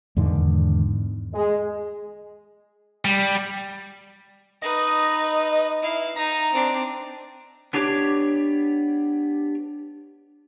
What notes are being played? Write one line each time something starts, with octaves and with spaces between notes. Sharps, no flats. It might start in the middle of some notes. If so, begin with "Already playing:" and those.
E2 G#2 D3 D#3
G#3
G3
D#4 B4 D#5
E4 F5
D#4 A#5
C4 D4
B3 D4 G4 C#5 D6